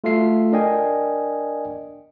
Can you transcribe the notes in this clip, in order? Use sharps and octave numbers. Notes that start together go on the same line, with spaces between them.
A3 F4 F#4 A4 E5 C7
D4 A#4 D5 D#5 G5 G#5